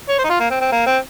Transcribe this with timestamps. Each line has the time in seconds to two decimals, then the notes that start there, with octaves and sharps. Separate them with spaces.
0.09 C#5
0.19 C5
0.24 D#4
0.30 F4
0.40 A#3
0.50 C4
0.61 C4
0.72 A#3
0.86 C4